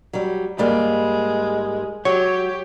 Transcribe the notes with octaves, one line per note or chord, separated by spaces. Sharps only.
F#3 G3
G#2 G3 G#3 A#3
F#3 G4 C#5